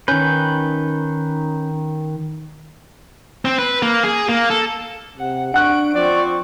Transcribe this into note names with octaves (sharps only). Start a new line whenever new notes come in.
D#3 C#4 B4 G6
C4
B4
A#3
G#4
A#3
A4
C3 F#5
D4 F#5 C#6 F#6 D7
F3 C4 D5 C#6